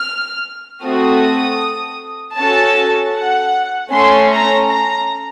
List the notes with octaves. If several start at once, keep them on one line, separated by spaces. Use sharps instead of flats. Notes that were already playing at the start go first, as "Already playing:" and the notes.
Already playing: F6
A3 C4 F#4 A4 D#6
C#4 F#4 A4 A5
F#5
A3 C#4 A4 C6
A#5
A#5